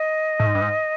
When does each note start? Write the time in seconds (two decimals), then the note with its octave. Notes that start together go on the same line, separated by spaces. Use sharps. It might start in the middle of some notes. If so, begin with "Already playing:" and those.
Already playing: D#5
0.40 A2
0.46 G#2
0.55 G2
0.61 G#2